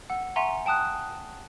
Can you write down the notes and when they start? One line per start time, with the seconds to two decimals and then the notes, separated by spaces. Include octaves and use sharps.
0.10 F#5 E6
0.36 E5 F#5 G#5 A#5 C6 C#6
0.66 G5 A5 D#6 F#6